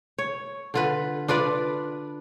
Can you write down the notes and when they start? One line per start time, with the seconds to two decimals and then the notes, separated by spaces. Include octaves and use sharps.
0.18 C#5
0.74 D3 F4 B4
1.28 D4 F4 B4 D5